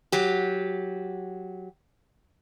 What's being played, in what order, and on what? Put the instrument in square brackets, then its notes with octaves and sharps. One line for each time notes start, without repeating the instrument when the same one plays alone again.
[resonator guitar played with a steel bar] F#3 G4